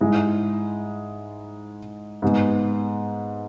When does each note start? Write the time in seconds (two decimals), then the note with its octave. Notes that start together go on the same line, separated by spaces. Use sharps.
0.01 G#2 G#3 E4
2.22 G#2 G#3 B3